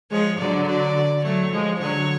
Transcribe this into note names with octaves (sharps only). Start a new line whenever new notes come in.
F3 G#3 C#5
D3 F#3 D5
D5
F#3 A3 C#5
F3 G#3
D3 F#3 C#5